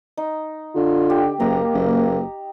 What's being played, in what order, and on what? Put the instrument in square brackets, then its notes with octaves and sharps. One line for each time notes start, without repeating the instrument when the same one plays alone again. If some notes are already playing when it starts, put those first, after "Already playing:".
[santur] D#4
[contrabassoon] D3 [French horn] F4
[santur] G4
[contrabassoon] F#1 [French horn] A#3 [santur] G4 A#5
[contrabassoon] F#1